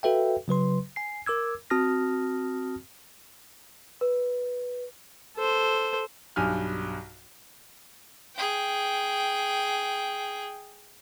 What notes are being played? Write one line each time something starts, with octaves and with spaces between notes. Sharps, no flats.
F#4 A4 B4 E5 F5 G5
C#3 F#3 B4 C6
G#5 C7
A#4 D6 E6 G#6
C4 F#4 A5 D#6 F6 A#6
B4
A4 C5
B1 G2 G#5 F6
G#4 G5